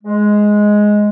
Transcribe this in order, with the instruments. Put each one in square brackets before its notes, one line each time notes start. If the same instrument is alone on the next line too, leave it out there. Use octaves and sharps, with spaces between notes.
[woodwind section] G#3